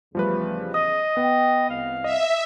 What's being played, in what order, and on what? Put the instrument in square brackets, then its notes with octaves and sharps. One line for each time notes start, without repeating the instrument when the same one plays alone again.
[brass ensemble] E2 C#3 [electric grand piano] F3 G3 B4 [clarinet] A3
[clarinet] D#5 [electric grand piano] D#6
[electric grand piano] B3 [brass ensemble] G5
[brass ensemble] C2 [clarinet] F5
[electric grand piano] D#5 [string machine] E5